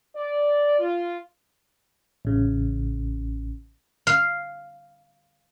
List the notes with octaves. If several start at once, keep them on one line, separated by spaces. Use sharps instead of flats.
D5
F4
A1 C#3
F5